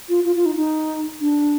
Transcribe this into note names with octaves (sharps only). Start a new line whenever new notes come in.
F4
F4
F4
D#4
D#4
D4